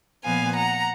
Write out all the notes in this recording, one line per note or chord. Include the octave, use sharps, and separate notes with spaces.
A#2 F3 B3 F5 G#5
F#5 A#5